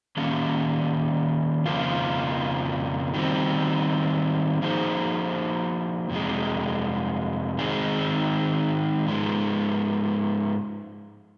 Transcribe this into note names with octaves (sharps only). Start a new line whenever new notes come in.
D#3 A#3 C#4 G4
F2 C#3 F3 A#3 F4
D#3 G3 C4
F3 A#3 D#4 G#4 C5
F2 C3 G#3
D#3 G#3 C4 D#4 G#4
G#2 F3 G#3